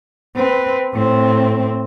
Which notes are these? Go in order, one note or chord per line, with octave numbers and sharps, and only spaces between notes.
C4 B4
A2 C4